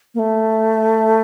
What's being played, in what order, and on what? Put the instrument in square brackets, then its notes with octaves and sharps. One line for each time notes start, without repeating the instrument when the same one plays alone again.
[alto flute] A#3
A3